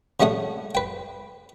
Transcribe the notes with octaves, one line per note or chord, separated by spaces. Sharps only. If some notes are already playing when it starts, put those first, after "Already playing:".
C#3 G3 A3 F#5 D#6
B4 G5